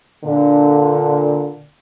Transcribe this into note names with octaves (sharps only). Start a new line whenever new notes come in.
A#2 D3